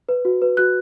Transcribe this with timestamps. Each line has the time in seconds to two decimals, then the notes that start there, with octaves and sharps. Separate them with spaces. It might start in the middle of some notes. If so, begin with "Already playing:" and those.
0.09 B4
0.25 F#4
0.42 B4
0.57 F#4 F#6